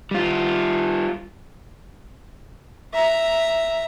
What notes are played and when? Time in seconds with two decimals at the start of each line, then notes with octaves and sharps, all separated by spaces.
0.11 G3 F4
2.93 E5 A#5